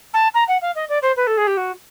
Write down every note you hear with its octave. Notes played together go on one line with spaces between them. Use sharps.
A5
A#5
F#5
F5
D#5
D5
C5
B4
A4
G#4
G4
F#4